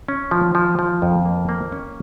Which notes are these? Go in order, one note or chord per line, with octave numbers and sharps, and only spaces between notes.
C#4
F3
F3
F3
F2
A#3
A#3
C#4